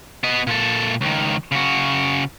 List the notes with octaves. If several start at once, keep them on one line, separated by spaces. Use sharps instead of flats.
B3 D#5
A#2 A4
C#2 D#3
C#3 F#4